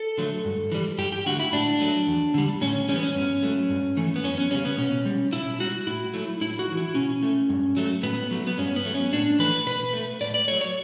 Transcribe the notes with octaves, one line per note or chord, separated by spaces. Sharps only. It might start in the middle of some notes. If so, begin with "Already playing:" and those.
Already playing: A4
D3 F#3 A3
G2
E3 G3
G2 G4
G4
D3 A3 F#4
E4
A2 D4
F#3 A3
E2
D3 G3
A2 C#4
E3 G3 B3 C#4
C#4
G2
F#3 A3
G2
E3 A3
B3
F#2 C#4
C#4
C#3 G3 C#4
B3
B2 C#4
G3
B2 E4
G3 F#4
A2 E4
F#3 A3
A2 E4
F#4
G3
E3
E4
B2 C#4
A3
G2
F#3 A3
A2 B3
F#3 A3
B3
G2 C#4
B3
F#3 A3
C#4
A2 D4
E3 A3 B4
B2 B4
A3
A2 D5
D5
F#3 A3 C#5
C#5